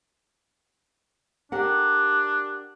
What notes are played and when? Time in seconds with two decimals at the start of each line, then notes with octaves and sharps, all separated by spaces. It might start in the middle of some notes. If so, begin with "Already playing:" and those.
1.52 D4 G4 A#4 F#5